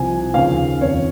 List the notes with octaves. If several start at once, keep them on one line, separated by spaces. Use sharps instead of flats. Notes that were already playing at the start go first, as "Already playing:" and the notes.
Already playing: C2 C3 F3 G#5
D#2 C#3 F3 F5
F2 D#3 C#5